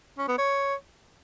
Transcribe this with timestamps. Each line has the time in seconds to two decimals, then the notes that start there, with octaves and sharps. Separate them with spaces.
0.19 C#4
0.28 B3
0.38 C#5